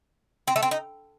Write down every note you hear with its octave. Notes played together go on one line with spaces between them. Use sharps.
C4
A3
C4
D#4